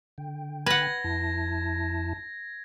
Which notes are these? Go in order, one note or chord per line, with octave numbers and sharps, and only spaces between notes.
D3 G5
B4 F#5 G#6 A#6
F2 E4 A5